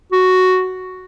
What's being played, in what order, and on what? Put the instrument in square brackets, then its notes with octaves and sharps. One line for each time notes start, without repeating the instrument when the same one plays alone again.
[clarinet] F#4